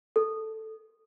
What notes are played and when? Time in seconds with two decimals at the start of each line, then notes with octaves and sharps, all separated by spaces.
0.16 A4